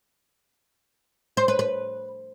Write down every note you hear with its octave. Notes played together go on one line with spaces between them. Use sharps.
C5
B4
B4